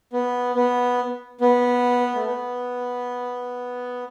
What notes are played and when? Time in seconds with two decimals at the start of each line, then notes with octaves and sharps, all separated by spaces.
0.13 B3
0.55 B3
1.41 B3
2.15 A3
2.26 B3